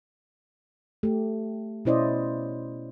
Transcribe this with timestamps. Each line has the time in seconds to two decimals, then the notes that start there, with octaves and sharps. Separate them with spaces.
1.03 A3 G4
1.85 B2 C#4 E4 C5 D5 D#5